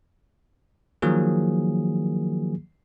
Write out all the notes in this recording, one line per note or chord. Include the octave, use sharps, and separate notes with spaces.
D#3 F3 F#3 A#3 G#4